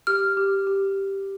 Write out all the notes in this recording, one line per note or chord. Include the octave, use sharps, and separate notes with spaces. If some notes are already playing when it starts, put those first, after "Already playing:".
G4 F6
G4
G4